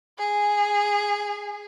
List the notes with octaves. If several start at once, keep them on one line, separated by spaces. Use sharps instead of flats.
G#4